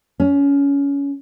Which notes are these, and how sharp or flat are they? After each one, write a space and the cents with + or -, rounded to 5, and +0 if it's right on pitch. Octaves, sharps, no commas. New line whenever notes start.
C#4 +20